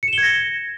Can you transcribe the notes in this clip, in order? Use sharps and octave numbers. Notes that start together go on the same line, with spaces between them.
G#6 A#6 C#7 E7 G7